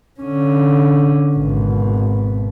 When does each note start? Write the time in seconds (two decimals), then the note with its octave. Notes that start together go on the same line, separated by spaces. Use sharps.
0.20 D3 C#4
1.34 G#1 B2